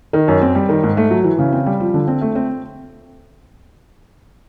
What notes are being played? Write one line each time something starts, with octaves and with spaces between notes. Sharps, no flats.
D#3
F#2
C4
G3
D#3
G#2
A3
F#3
E3
C#3
C4
G3
F3
D3
C4
A3
C4